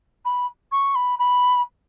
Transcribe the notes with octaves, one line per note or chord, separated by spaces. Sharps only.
B5
C#6
B5
B5